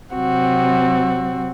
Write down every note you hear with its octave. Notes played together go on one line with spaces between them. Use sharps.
C3 F#3 C4 F#4